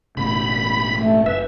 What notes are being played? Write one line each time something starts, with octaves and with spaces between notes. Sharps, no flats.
E1 A2 C#3 B5
A3
F#1 B4 E5